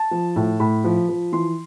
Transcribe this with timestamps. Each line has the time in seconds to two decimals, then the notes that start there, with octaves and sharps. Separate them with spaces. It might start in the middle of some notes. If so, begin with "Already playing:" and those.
Already playing: A5
0.11 F3
0.36 A2
0.60 A2 B5
0.84 F3
1.09 F3
1.32 E3 C6